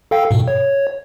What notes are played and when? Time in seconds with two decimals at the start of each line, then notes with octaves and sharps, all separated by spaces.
0.11 A4 F5 G5
0.31 G#2 B2
0.48 C#5